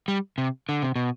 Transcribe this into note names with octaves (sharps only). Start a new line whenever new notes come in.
G3
C3
D3
C3
B2